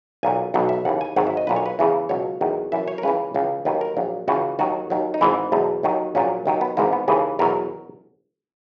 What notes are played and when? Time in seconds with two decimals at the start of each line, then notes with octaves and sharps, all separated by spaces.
0.23 B1 A#2 F#3 G#5
0.54 B1 B2 F#3 F#5
0.69 E5
0.85 D#2 C#3 E3 F#5
1.01 G#5
1.16 G#1 G#2 D#3 F#3 F#5
1.27 E5
1.37 D#5
1.47 B1 A#2 F#3 B4
1.56 C#5
1.66 B4
1.79 E2 C#3 E3
2.09 C#2 B2 F#3 C#5
2.41 E2 D#3 F#3
2.72 F#2 E3 E5
2.88 C#5
2.98 A#4
3.03 C#2 C#3 E3 B4
3.34 C#2 C#3 E3
3.65 D#2 D#3 F#3 B4
3.81 A#4
3.97 A#1 A#2 F#3
4.28 C#2 C#3 E3 F#4
4.59 D#2 D#3 F#3 F#4
4.90 D#2 D#3 F#3
5.14 D#4
5.21 G#1 G#2 E3 E4
5.52 E2 B2 F#3
5.83 D#2 D#3 F#3
6.15 A#1 A#2 F#3 C#4
6.46 D#2 D#3 F#3
6.61 B3
6.77 G#1 G#2 E3 A#3
6.93 B3
7.08 D#2 C#3 E3 G#4
7.39 E2 B2 F#3 A#4